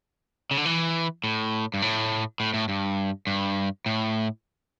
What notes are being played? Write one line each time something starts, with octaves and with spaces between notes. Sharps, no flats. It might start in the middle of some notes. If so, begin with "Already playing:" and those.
C#3
D3
E3
A2
G2
A2
A2
A2
G2
G2
A2